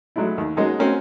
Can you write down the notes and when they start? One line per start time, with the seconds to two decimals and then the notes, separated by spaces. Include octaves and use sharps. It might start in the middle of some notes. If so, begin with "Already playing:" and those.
0.16 F#3 G#3 A3 D4 E4
0.38 D#2
0.57 G#3 A#3 C#4 D#4 F#4 G#4
0.79 A#3 C4 C#4 F#4 A#4